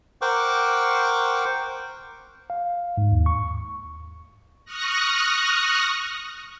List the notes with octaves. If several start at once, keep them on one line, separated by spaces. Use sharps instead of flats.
A#4 C5 F#5 G5 C#6 D6
F5
G#2
D#2
C#6
C#6 D#6 F6 F#6 A#6